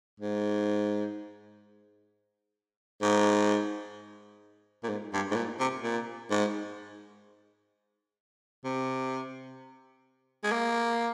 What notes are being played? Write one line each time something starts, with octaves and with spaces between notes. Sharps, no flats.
G#2
G#2
A#2
G#2
G2
G#2
A#2
C3
A#2
G#2
C3
G#3
A#3